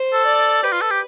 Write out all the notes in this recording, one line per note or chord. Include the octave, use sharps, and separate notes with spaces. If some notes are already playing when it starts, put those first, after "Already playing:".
Already playing: C5
A4
D5
G4 B4
F4
A4
G4